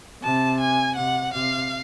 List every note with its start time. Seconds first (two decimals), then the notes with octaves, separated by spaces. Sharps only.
0.23 C3 A5
0.60 G#5
0.96 C3 F#5
1.33 C3 F5